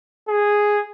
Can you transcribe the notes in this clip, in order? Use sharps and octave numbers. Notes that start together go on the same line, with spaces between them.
G#4